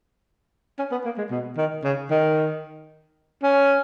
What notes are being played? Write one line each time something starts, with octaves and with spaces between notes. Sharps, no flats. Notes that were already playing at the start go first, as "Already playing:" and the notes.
C#4
B3
A#3
G#3
B2
D#3
C#3
D#3
C#4